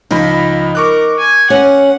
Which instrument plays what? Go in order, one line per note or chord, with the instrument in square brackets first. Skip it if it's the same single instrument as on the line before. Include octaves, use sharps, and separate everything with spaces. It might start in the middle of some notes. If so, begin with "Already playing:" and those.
[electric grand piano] C#2 F3 B5 [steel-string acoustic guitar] D#4
[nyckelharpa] A#4 [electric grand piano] C#6 D6 F#6
[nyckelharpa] G#5
[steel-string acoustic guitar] C#4 [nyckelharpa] F#5